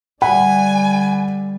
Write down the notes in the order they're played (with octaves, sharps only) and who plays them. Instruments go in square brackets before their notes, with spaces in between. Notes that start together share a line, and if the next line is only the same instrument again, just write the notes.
[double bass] D3 G3 [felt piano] F#5 B5 [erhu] G#5